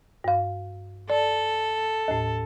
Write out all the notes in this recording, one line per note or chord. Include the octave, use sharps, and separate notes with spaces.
G2 F5
A4 D5
D#2 A2